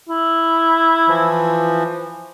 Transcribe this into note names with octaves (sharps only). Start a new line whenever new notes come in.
E4
E3 F3